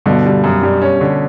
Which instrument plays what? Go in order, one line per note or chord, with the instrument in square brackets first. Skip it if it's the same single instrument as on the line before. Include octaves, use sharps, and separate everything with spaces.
[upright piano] G2 B2 [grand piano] D3
[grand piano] G3
F#2
G3
C#4
D3